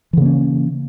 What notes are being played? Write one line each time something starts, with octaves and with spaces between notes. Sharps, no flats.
C#3 E3 A#3 C#4